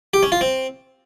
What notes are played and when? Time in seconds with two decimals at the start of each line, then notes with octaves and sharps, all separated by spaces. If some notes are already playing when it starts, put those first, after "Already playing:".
0.14 G4
0.23 C#4
0.32 F4
0.41 C4